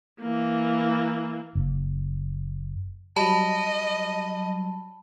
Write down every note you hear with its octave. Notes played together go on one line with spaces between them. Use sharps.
E3 A#3
F#1
F#3 G3 D#5 A5 B5